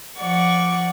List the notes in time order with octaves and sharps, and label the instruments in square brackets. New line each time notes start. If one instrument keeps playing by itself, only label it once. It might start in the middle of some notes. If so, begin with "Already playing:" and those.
[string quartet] F3 D5 F#5 C#6